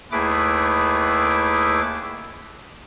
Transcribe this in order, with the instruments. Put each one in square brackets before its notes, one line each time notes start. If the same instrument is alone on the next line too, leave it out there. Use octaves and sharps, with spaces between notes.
[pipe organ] D#2 A3 E4 G#4 B4 D6